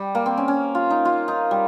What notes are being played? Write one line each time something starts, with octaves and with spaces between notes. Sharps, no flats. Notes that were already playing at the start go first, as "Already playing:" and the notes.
Already playing: G3
A#3
C4
C#4
C#4
F4
D#4
F4
D#4
G3